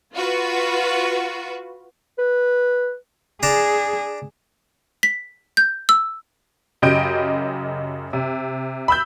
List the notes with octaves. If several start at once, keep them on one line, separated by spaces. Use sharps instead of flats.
F4 F#4 B4
B4
D4 G#4 A5 A#5
B6
G6
E6
F#2 C#3 G4 D#5 G6 D7
C3
B5 E6 G6